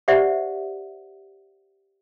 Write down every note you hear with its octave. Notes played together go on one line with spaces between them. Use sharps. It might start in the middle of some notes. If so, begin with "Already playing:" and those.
G4 C5 D5 E5 F#5